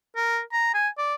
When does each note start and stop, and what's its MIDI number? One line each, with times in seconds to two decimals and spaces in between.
0.16 0.40 70
0.52 0.73 82
0.74 0.88 80
0.98 1.15 74